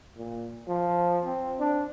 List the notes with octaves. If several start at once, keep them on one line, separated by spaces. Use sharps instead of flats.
A#2
F3
C4
D4